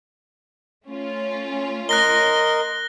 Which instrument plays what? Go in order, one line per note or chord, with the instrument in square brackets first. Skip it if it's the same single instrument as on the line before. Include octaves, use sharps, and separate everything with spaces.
[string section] A3 C#4 F4
[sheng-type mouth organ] A#4 D#5 C6 [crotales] F#6 A#6 G7